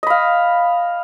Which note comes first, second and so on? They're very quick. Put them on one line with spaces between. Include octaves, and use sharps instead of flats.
D#5 B5 F5